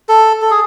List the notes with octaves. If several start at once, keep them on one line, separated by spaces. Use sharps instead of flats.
A4
A4
G#4